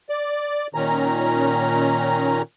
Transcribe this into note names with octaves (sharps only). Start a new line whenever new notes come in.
D5
A#2 D#3 C#4 A#5